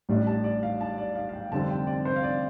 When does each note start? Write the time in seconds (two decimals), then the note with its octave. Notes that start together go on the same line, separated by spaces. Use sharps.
0.09 A1 A2 G3 D4
0.27 A5
0.44 D5
0.63 F5
0.81 A5
0.98 D5
1.16 F5
1.29 F5
1.33 G5
1.52 F1 F2 D3 G3 C4 A5
1.69 G5
1.87 D5
2.05 C5
2.16 F5
2.23 D5